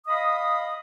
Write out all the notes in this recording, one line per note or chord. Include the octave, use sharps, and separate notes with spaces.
D#5 F5 B5 D#6